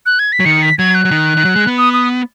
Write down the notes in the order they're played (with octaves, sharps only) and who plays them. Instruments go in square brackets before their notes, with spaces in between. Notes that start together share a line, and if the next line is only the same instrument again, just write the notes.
[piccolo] F#6
G#6
B6
[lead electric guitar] F#3
[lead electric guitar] D#3 [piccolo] C#7
[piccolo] B6
[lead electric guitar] F#3 [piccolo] G#6
[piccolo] F#6
[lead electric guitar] F#3
D#3
D#3
F#3
G#3
B3
[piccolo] D#6
D#6